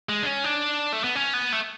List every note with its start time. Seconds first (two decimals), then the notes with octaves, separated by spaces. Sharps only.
0.09 G#3
0.23 D4
0.26 C#4
0.44 D4
0.93 A3
1.04 B3
1.15 C#4
1.33 B3
1.53 A3